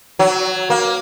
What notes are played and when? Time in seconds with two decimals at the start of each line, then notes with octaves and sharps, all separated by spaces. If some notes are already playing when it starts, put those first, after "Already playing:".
0.19 F#3
0.70 A#3